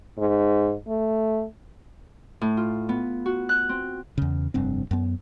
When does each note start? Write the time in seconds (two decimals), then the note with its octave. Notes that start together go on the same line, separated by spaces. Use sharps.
0.19 G#2
0.88 A3
2.41 A2
2.57 F4
2.89 B3
3.26 F#4
3.49 F#6
3.69 C4
4.18 E2 C#3
4.54 F1 G2 C4
4.91 F#2 B3